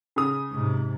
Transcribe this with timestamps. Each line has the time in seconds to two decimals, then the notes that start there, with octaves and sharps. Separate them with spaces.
0.16 C#3 D#6
0.51 G#2 C3